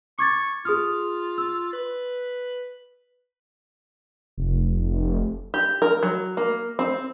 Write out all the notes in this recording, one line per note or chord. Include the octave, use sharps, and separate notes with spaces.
C#6 D6 G#6 A6
F4 G#4 D#6 F6
E6
B4
F1
G4
A#4
F#3
A#3
C4